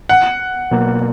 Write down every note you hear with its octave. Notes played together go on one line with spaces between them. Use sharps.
F#5
B2 F#3 A#3